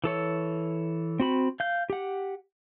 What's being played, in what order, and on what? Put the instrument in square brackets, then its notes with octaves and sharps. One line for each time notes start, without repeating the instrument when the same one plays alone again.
[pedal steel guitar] E3 A4 C#5
C4 F#4 B5
F5 G6
G4 F#5